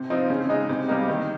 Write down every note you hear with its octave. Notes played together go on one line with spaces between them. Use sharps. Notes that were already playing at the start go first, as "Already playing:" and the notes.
Already playing: C3
F3 C4 D#4
C#3
G#3 D#4
C3
G3 A#3 D#4
D#3